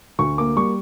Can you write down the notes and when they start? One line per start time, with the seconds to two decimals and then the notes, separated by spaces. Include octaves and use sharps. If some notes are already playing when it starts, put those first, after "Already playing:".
0.19 D2 C#6
0.38 A#3 D6
0.56 G3 C#6